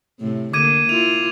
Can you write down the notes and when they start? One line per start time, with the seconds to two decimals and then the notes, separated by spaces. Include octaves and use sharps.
0.20 A2 C3
0.53 D3 A#3 D6 G#6 D#7
0.89 A#3 E4 F4 F7